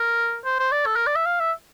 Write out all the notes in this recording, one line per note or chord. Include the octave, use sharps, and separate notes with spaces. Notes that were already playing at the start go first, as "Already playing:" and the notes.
Already playing: A#4
C5
C5
D5
A4
A#4
D5
E5
F5
E5